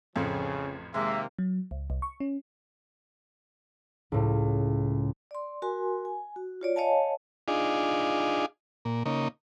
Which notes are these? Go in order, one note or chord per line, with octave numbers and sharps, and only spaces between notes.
A1 F2 C#3 F3
C3 D#3 G#3 A#3 E5
F#3
C#2
C2
C#6
C#4
C#2 A2
D5 C6
F#4 A#4 G#5 C6
G#5
F#4
F4 C#5 D5
C#5 D#5 F5 G#5 A5
D4 D#4 F4 G#4
A#2
C#3 A#3 D#4